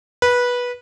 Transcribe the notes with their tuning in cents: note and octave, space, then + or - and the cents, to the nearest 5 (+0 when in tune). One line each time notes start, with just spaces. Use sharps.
B4 -15